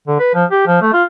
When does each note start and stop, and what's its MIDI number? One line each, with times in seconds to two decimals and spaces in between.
0.08 0.18 50
0.20 0.33 71
0.34 0.45 53
0.50 0.63 67
0.67 0.77 53
0.82 0.91 57
0.94 1.04 65